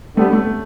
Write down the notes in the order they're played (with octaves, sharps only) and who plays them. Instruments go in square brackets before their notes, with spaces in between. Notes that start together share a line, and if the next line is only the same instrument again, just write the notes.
[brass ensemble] D3 G3 B3 [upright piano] A3
[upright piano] A3